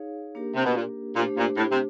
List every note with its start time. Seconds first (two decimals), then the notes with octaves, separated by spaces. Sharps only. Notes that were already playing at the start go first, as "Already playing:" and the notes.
Already playing: D#4 G#4 C#5 F5
0.35 A#3 D4 G4 A#4
0.56 C3
0.65 B2
0.75 A#2
1.16 A#2 A3 D4 G4 C5
1.38 A#2
1.57 A2
1.72 C3